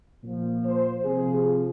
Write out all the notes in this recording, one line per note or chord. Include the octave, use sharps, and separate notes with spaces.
A#2 F3
C5
C3 F3 G#4